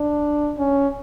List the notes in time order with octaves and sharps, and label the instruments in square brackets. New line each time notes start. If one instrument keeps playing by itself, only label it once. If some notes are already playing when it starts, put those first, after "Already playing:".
Already playing: [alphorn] D4
C#4